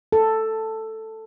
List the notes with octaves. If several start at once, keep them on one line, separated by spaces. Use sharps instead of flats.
A4